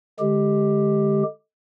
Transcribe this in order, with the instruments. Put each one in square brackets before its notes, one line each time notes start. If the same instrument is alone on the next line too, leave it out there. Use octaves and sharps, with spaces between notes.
[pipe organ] D3 G#3 G4